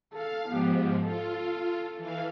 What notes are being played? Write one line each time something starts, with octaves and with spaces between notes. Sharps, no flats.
A4 F5
G#2 F3 B3 G4
F4 A4
E3 F5